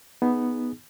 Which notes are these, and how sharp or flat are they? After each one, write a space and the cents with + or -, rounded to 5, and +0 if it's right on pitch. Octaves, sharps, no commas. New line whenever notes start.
B3 +0 D#4 +0 G#4 +0